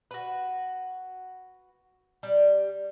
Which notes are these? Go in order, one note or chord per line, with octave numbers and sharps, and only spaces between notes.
F#4 B4
G3